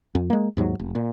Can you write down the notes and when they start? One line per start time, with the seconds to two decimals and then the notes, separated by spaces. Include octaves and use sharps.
0.15 F2
0.30 G#3 A#3
0.57 D#2 G#2 F#3
0.79 F1
0.95 A#2